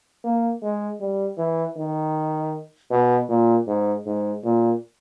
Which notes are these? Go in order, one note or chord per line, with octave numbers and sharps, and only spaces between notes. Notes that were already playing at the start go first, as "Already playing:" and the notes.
A#3
G#3
G3
E3
D#3
B2
A#2
G#2
G#2
A#2